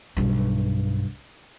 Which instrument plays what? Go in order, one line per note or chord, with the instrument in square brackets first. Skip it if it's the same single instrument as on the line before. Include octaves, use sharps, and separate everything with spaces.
[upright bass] B1 G2